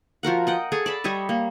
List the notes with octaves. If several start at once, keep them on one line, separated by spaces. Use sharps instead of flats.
F3 F#4 A#4 F#5
D#5 F#5 G5
G#4 A4 C#5 G#5
D5 A5 B5
G3 C#5 D#5 E5
A#3